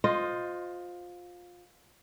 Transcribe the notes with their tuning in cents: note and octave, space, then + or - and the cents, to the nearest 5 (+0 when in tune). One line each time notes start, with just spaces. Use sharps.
F4 +20 C5 +0 D#5 +0